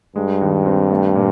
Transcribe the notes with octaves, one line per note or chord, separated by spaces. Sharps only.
G2 G#3
D#2
C4
A3
A#2